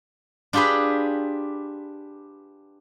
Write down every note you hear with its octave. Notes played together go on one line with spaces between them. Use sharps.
D4 F4 G4 G#4 B4